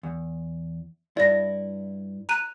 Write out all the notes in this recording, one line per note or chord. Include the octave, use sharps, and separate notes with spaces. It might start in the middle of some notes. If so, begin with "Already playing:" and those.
E2
G2 E4 D5 A#6
A#5 F#6 D#7